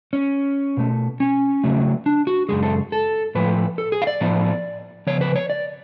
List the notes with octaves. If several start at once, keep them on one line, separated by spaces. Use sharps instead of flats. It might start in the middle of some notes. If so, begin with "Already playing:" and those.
C#4
B2 A3
C#4
C#3 F#3 A3
D4
F#4
F#2 C#3 F3 G#3 G#4
A4
A4
A2 F3 A3 B4
A4
G#4
F5
D5
A2 F3 B3
C#3 F3 B3 C#5
B4
C#5
D5